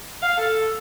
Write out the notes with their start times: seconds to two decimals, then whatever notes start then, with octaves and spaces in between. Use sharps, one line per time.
0.22 F5
0.37 A4